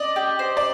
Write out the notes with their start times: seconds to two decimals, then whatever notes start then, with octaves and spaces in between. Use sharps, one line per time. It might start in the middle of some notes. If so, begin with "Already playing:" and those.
Already playing: D5 D#5
0.16 G4
0.39 C5
0.57 D5